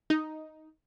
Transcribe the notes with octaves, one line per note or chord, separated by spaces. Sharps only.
D#4